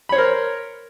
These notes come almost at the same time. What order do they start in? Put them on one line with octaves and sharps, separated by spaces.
B5 C#5 C5 A#4